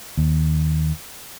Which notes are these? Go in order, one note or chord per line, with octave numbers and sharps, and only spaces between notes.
D#2